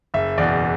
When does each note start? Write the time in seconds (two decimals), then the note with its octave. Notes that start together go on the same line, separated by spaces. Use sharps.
0.14 F#1 E5
0.38 E2 B2 D5